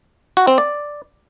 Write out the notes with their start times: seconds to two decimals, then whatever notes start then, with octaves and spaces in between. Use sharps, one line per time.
0.37 F#4
0.47 C4
0.58 D5